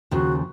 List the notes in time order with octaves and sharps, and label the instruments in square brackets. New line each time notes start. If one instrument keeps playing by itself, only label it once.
[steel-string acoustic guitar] D#2 C#3 F3 [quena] F#4